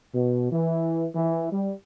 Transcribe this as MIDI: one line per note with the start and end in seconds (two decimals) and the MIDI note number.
0.13 0.50 47
0.51 1.06 52
1.15 1.50 52
1.51 1.72 55